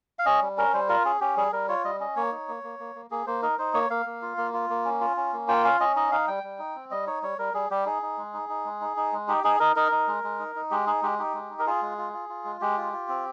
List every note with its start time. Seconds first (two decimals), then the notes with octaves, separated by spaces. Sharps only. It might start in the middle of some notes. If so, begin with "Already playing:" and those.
0.19 F5
0.26 C#4 D#5
0.42 G3
0.57 C#4 A#4
0.73 G3 C5
0.89 F4 A#4
1.05 C#4 G#4
1.21 C#4 G4
1.37 G3 G#4
1.52 G3 A#4
1.69 F4 C#5
1.84 G3 D#5
2.00 C#4 D#5
2.16 A#3 C#5
2.32 D#4
2.48 A#3
2.63 A#3
2.79 A#3
2.95 A#3
3.11 A#3 G#4
3.27 A#3 C5
3.42 D#4 A#4
3.59 D#4 C5
3.74 A#3 C#5
3.90 A#3 F5
4.06 A#3
4.22 F4
4.37 A#3
4.54 F4
4.70 A#3
4.85 C#4
5.00 F4
5.17 C#4
5.33 A#3
5.48 F4 G5
5.64 C#4 F5
5.80 C#4 D#5
5.96 D#4 D#5
6.11 D#4 F5
6.28 G3 G5
6.43 G3
6.59 D#4
6.75 C4
6.91 G3 D#5
7.07 D#4 C#5
7.23 G3 C#5
7.38 G3 A#4
7.54 G3 G#4
7.70 G3 G4
7.86 D#4 G#4
8.02 D#4
8.18 G#3
8.34 D#4
8.49 D#4
8.65 G#3
8.81 D#4
8.97 D#4
9.13 G#3
9.28 D#4 G4
9.44 D#4 G#4
9.60 D#4 A#4
9.76 D#4 A#4
9.92 D#4
10.08 G#3
10.24 G#3
10.39 D#4
10.55 D#4
10.71 G#3 G4
10.86 D#4 G#4
11.02 G#3 G4
11.19 D#4 G4
11.34 G#3
11.50 D#4
11.59 A#4
11.66 F4 G#4
11.82 G#3
11.98 F4
12.13 F4
12.29 F4
12.45 G#3
12.61 G#3 G4
12.77 F4
12.93 F4
13.08 C4